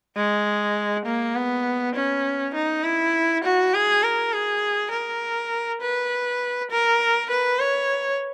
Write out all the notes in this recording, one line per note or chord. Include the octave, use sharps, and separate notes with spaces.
G#3
A#3
B3
C#4
D#4
E4
F#4
G#4
A#4
G#4
A#4
B4
A#4
B4
C#5